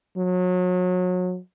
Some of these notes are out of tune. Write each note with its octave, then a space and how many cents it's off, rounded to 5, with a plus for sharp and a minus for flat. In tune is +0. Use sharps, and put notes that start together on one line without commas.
F#3 -30